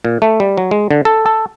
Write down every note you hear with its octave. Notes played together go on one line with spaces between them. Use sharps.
A#2
A3
G3
F#3
G#3
D3
A4
A4